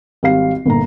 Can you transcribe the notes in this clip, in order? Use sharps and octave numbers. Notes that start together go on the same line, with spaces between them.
G#1 G3 F5 C7
G1 A#2 A#5